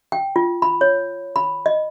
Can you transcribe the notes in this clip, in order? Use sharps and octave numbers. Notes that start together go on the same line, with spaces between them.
G5
F4
B5
C#5
B5
D#5